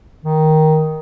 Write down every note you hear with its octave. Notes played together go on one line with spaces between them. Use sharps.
D#3